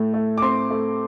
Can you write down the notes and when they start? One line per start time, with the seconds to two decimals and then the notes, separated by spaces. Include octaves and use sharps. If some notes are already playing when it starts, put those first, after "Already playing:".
Already playing: A2 A3
0.14 A3
0.38 D6
0.42 C4 C6
0.71 A3